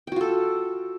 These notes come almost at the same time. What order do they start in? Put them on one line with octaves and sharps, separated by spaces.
G5 F#4 F4 A4